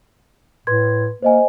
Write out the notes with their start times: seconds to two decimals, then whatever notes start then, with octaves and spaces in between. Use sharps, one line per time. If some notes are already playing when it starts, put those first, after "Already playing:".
0.67 A2 B4 C6 G#6
1.22 A#3 C5 D#5 G#5